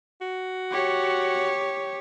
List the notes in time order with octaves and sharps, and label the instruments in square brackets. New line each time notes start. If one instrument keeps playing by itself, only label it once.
[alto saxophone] F#4
[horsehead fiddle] G4 C#5